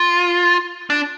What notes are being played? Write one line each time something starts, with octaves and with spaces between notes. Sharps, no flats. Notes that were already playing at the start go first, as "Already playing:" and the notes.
Already playing: F4
D4